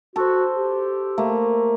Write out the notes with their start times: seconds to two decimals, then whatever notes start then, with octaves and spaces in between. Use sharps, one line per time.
0.16 F#4 A4 C5
0.56 G4
1.18 A3 A#3